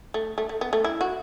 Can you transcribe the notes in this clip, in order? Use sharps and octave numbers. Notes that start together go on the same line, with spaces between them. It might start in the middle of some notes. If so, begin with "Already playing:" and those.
A3
A3
A3
B3
A3
E4
F#4